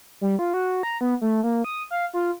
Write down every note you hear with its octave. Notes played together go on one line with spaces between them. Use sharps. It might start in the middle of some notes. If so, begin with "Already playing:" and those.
G3
F4
F#4
A#5
B3
A3
A#3
D#6
F5
F4